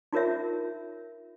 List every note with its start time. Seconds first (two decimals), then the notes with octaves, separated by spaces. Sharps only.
0.13 D#4 F4 A#4 C#5 E5